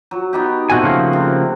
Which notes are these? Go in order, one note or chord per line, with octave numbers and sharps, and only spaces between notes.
F#3
B3 D#4 G4
B2 A3 C4 F#4 F#5 G#5
C#3 F3 A#3
C3